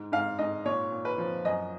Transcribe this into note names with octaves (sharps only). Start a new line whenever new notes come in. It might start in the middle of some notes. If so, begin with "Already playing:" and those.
Already playing: G#2
G#2 F5
G#2 D#5
A#2 C#5
A#2
B4
F3
F#2 D#5